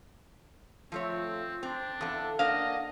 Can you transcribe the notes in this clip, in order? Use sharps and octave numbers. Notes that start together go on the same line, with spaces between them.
F3 A3 C4 F4 C#5
C4 D4
E2 A4 F5
A#3 D4 D#5 F5 F#5